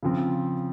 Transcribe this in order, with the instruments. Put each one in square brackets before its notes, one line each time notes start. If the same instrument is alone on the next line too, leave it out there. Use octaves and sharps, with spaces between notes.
[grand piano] C#3 F3 C4